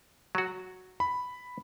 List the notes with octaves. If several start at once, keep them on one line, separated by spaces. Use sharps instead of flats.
F#3 F#4
B5